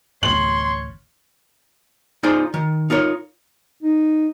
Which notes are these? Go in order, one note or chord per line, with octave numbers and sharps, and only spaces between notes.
A1 D2 C#5 C6 F#7
D#4 F4 G#4 C5 D5
D#3
D#4 F4 A#4 C#5
D#4